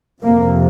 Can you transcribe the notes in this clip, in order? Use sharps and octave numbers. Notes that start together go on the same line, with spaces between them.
F2 C3 A#3